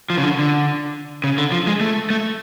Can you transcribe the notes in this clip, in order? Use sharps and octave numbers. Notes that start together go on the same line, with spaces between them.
F3
C#3
D3
D3
C#3
D3
F3
G#3
A3
A3